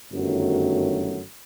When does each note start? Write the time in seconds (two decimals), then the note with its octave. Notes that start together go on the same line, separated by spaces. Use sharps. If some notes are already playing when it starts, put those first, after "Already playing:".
0.12 G1 F#2 D#3 F#3 A3